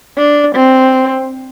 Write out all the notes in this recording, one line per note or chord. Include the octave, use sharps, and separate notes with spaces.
D4
C4